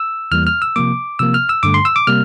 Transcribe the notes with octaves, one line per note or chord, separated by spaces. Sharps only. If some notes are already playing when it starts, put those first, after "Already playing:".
Already playing: E6
E2 E3 G3 A#3 F6
F6
E6
C3 F3 A#3 D6
C3 F3 A#3 E6
F6
E6
G2 D3 A3 D6
C6
E6
D6
C3 G3 A#3 F6